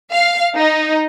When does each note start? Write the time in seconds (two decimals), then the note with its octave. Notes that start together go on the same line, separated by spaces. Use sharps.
0.12 F5
0.57 D#4